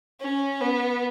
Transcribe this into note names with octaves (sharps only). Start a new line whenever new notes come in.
C#4
B3